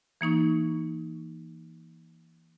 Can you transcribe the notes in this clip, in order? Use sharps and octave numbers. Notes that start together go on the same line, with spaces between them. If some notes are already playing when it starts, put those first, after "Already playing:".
E3 A#3 D#4 C#6